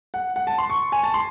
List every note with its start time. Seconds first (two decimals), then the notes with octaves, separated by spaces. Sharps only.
0.14 F#5
0.36 F#5
0.47 A5
0.58 C6
0.70 C#6
0.92 G#5
1.03 A5
1.14 C6